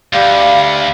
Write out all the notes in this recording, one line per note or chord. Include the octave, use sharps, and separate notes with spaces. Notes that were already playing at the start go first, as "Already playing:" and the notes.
D2 G3 F5